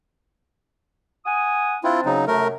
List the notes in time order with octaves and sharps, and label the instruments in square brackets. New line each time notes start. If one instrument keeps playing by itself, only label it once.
[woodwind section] F#5 G#5 D#6
[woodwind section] C4 D4 [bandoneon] E4 F4
[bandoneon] C#3 F#3 D#4
[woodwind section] F#2 C3 [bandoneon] A3 A#4